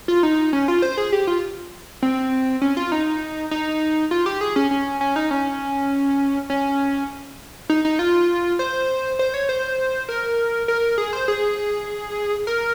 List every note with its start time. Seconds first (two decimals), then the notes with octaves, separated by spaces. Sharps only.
0.08 F4
0.23 D#4
0.53 C#4
0.68 F4
0.82 C5
0.97 G#4
1.12 G4
1.27 F4
2.03 C4
2.62 C#4
2.77 F4
2.92 D#4
3.51 D#4
4.11 F4
4.26 G4
4.41 G#4
4.56 C#4
4.71 C#4
5.01 C#4
5.16 D#4
5.31 C#4
6.50 C#4
7.70 D#4
7.85 D#4
7.99 F4
8.59 C5
9.19 C5
9.34 C#5
9.49 C5
10.09 A#4
10.68 A#4
10.98 G#4
11.13 C5
11.28 G#4
12.47 A#4